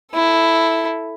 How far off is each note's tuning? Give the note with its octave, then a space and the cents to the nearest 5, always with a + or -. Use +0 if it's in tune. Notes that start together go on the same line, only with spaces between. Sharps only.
E4 +0 A4 +0